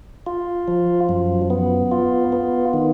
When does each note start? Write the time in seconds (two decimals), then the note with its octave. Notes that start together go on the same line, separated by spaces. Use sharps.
0.26 F4
0.68 F3
1.09 F#2
1.50 B3
1.91 F4
2.33 B3
2.73 D#3